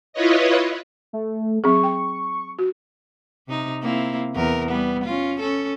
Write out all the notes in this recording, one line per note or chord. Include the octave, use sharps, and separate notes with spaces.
E4 F4 B4 C#5 D#5
A3
F#3 C4 G#4 C#6
G5
F#4
C3 D#4
A#3 C4 E4
E2 A#4
G3 B3
C#4 F4
C#4 A4